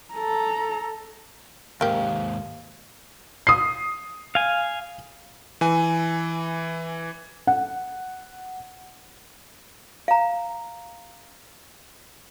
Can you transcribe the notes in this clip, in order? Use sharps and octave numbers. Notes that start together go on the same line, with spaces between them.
A4 A#5
D#2 G#2 A#3 G4 F5
D#6 C7
F5 G#5
E3 G#5
F#5
F5 A#5